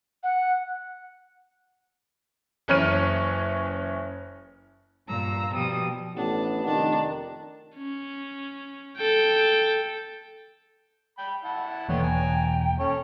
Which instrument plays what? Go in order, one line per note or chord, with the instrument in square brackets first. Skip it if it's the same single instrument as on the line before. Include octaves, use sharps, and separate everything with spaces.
[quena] F#5
[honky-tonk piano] F#1 E3 C#4 C#5 F6 D#7
[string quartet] G2 A#2 A#5 E6
B2 F3 G3 D#6
[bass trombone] A1 [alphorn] B3 [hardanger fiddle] D4
[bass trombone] F1 [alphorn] D#3 [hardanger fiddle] D4
[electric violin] C#4
A4 G5
[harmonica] G5 B5
E4 F#5 A5
[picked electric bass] E1 E3 A#3 [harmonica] D3 B3 C#5 [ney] G5
[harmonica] G#5 A#5
[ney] C#4 [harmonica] A4 C#5